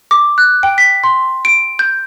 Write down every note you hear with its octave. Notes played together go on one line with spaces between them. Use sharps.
D6
F#6
G5
B6
C6
D7
G6